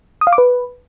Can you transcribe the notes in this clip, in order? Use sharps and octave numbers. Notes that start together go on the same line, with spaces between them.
D#6
F5
D6
B4